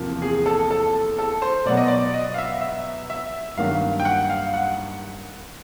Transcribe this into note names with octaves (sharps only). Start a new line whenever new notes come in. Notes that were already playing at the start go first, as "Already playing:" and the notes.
Already playing: E2 C3 F3 A#3
G#4
A4
A4
A4
C5
B2 F#3 B3 D5
D#5
D5
D#5
F5
E5
E5
E5
G2 D#3 F#3 A#3 F5
G5
F#5
F5
F#5